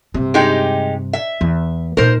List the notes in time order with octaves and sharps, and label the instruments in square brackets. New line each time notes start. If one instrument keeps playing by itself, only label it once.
[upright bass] G2 C3
[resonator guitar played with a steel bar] G#3 D#4 G4
E5
[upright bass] E2
[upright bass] A#2 D#4 [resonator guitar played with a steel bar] A#4 C5